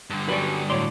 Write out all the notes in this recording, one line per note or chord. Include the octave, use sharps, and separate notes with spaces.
G2 D3
F#3 G3 C#4 B4 D5
A2 F#3 C#5 D5 C6